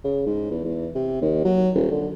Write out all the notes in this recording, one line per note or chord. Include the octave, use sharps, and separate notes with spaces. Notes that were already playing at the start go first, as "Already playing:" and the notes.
C#3
G#2
E2
E2
C3
D#2
F#3
D#1
D3